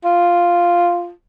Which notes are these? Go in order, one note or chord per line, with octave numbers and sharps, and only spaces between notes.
F4